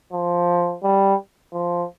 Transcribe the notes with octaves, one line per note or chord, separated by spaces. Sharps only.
F3
G3
F3